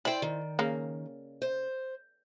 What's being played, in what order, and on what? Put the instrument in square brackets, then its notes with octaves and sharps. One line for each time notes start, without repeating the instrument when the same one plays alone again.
[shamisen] E4 C5 [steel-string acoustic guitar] D5 G5
[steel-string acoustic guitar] D#3
[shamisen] C#3 A#3
[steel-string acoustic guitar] C5